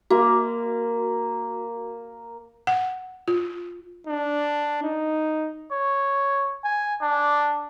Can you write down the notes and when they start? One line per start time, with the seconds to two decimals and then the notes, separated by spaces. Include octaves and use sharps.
0.10 A#3 F#4
2.67 F#5
3.28 F4
4.07 D4
4.83 D#4
5.71 C#5
6.64 G#5
7.01 D4